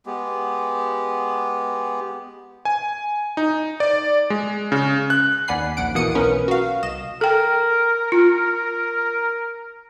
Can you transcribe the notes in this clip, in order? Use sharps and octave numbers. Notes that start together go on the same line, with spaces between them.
G#3 B3 G4
G#5
D#4
D5
G#3
C#3
F#6
D#2 D5 F#5 G#5 B5 C7
A#1 D#2 F#5 D7
B2 E3 A#3 D#6 C#7 D#7
B1 C#4 A#4 B4
F#4 F5
C2 D#5 E7
A4 A#4 G5
F4